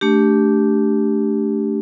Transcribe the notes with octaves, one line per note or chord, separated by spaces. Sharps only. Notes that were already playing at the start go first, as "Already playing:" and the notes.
A3 D4 G4